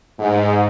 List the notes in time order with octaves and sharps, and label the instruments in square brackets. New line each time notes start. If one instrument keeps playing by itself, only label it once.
[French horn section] G#2